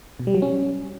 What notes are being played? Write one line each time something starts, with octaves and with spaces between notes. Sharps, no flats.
B2
G3
F#3
C#4